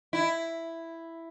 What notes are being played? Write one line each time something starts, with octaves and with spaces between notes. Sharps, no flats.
E4